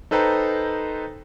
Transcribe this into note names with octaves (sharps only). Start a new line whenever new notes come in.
D#4 A4 B4 C5 G5 A#5